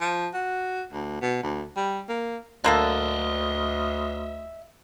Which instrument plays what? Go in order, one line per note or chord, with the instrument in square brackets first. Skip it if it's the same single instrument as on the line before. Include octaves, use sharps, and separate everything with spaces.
[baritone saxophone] F3
F#4
D2
B2
D2
G3
A#3
[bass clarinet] D2 [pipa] D3 A#3 A4 [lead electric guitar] D#5 E5